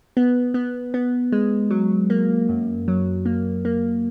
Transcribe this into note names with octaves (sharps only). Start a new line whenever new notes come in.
B3
B3
B3
G#3
F#3
A#3
F#2
F#3
A#3
A#3